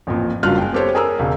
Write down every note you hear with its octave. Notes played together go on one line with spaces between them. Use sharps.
A1 F2 A#2
F#1 G2 F#3 F4 F6 F#6
G#3 G5
B3 G4 A4 C5 C#5
G#4 A#4 A#5 E6
E1 C#3